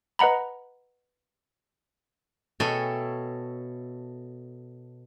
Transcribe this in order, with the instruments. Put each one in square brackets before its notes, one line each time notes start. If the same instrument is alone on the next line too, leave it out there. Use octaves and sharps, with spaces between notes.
[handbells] B4 D#5 F#5 A#5 B5
[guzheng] B2 A4 C#5 E5 G5 G#5